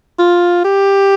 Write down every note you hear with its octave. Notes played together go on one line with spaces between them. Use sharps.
F4
G4